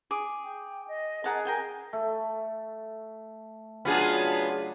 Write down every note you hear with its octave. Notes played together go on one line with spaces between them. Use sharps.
G#4 D6
G5
D#5
G#4 A#4 F#5 A5
A#4 G5 G#5
A3
C#3 F#3 B3 D4 F4 G#4